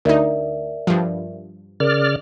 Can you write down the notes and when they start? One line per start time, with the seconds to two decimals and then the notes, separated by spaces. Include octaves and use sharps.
0.05 D2 D#4 A#4 D5 E5
0.87 G2 F3
1.80 C#3 A#4 D5 F6